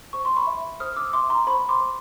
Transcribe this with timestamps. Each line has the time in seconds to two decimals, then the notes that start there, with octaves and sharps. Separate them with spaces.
0.13 C5 C#6
0.25 C6
0.36 B5 C#6
0.47 E5
0.80 C5 D#6 F6
0.92 F6
0.97 D6 E6
1.13 E5 C6 D6
1.30 A#5 C6
1.47 C5 B5 C#6
1.69 C6 D6
1.81 C5